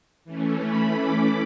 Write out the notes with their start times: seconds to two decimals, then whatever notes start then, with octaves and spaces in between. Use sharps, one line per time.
0.25 E3 A3 C#4
0.62 B5
0.99 D6